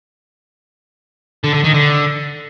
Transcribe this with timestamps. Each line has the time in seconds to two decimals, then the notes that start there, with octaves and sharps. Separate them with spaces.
1.44 D3
1.54 D3
1.64 D#3
1.74 D3